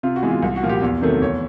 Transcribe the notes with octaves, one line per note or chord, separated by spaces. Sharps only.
C3 F4
F#4
E3 G#3 B3
F4
C2
F#4
A#2 F3
G4
E2
C3 D#3 F#3 A3
E2 C#5